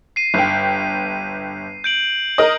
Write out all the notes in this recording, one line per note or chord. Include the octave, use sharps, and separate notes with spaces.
C7 D#7
G1 G5
G6 D7 F#7
A#4 D#5